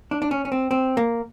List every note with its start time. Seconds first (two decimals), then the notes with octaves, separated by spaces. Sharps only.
0.11 D4
0.22 D4
0.31 C#4
0.45 C#4
0.52 C4
0.71 C4
0.97 A#3